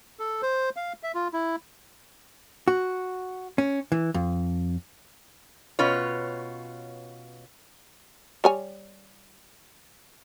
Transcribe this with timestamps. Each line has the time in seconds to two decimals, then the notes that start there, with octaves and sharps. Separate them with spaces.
0.19 A4
0.42 C5
0.76 F5
1.03 E5
1.15 F4
1.33 E4
2.68 F#4
3.58 C#4
3.92 E3
4.14 F2
5.79 B2 C#4 F4 B4 C#5
8.44 G3 C#5 G#5